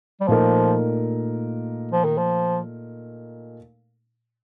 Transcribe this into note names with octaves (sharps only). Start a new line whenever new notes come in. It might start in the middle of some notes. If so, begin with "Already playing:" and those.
G3
A#2 F3 A3 D#4 A#4
F3
D#3
F3